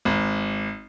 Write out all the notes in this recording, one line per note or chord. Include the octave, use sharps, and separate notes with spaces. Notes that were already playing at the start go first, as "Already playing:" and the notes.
G#1